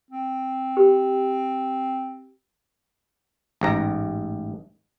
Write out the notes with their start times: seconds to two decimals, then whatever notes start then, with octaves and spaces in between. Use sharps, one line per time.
0.11 C4
0.77 G4
3.61 A1 G#2 A#5